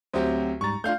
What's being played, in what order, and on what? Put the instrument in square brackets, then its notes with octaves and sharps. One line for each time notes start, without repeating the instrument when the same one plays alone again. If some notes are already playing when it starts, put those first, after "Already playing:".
[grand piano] D2 F#3 G4 [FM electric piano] C4 C5
[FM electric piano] G#2 G3 A6 [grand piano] A#5 C#6
[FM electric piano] A3 D4 F4 [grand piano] F5 G6